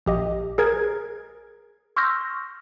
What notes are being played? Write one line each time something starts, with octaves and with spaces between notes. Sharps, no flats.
A#1 G4 D#5
G#4 A#4 G#6
C6 C#6 E6 F6 G6 A#6